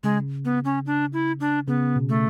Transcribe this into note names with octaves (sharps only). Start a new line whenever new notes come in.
C#3 G#3
B3
C#4
D4
E4
D4
C#3 B3
B2
A3